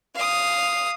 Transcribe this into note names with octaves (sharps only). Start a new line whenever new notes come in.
F5 D#6